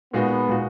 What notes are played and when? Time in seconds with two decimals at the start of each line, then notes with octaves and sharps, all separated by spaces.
0.14 A#2 G#3 B3 D#4 F#4
0.49 A#2 G#3 D#4 F#4